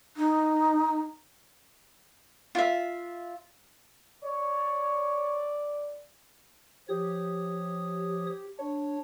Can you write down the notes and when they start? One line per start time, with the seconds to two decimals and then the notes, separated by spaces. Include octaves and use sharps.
0.17 D#4
2.55 F4 E5
4.24 C#5 D5
6.89 F3 G4 C#5 D#6
8.59 D4 C#5